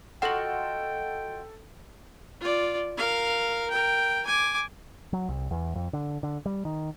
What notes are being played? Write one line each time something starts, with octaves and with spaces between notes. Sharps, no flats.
F4 F#4 A4 D#5 F#5 G5 E7 F#7
F4 D5
A#4 F5
A#4 G5
G#5 D6
F#3
C2
E2
F2
D3
D3
G3
D#3